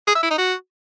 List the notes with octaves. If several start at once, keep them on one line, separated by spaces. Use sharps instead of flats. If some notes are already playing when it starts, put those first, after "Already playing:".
G#4
E5
E4
D#4
F#4